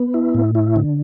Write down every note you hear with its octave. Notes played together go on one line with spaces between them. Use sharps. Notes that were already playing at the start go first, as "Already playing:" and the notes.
Already playing: B3
E4
A2
E4
D3